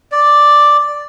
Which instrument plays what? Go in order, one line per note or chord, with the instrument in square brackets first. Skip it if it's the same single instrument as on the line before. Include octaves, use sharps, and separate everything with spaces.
[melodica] D5